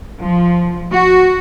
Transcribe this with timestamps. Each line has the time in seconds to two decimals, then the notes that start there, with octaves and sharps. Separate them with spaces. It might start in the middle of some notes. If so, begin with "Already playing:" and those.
0.21 F3
0.90 F#4